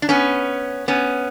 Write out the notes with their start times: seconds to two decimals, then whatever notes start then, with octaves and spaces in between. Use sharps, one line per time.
0.02 D4
0.09 B3 C#4
0.88 B3 C#4